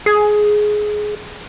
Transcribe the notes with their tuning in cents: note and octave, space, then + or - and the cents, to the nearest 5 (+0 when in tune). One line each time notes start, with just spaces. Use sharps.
G#4 +15